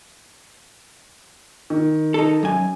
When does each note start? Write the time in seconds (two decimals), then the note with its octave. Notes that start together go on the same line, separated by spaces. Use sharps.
1.70 D#3
2.14 D#4 A4
2.43 F#2 G#5